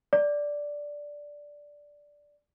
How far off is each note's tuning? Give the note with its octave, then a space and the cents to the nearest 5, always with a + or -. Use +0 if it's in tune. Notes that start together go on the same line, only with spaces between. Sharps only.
D5 -5